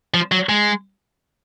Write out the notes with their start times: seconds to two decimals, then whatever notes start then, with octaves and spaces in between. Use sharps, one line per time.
0.14 F3
0.32 F#3
0.49 G#3